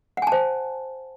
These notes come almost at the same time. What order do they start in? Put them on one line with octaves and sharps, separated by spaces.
F#5 G#5 A5 C5